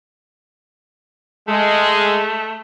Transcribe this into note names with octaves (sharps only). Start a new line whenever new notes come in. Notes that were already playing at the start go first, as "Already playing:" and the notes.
G#3 A3